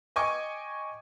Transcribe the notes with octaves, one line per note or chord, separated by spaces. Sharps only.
D#5 G5 G#5 C#6 D6